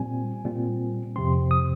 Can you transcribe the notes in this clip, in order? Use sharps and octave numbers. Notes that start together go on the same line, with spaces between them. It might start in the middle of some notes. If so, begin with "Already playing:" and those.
Already playing: A#2 G3 C4 G#5
A#2 G3 C4
F2 C3 F3 C4 C6
D#6